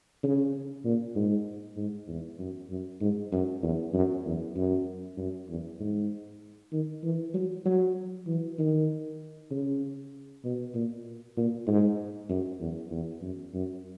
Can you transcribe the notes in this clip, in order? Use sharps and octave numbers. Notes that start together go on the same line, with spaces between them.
C#3
A#2
G#2
G#2
E2
F#2
F#2
G#2
F#2
E2
F#2
E2
F#2
F#2
E2
G#2
D#3
E3
F#3
F#3
E3
D#3
C#3
B2
A#2
A#2
G#2
F#2
E2
E2
F#2
F#2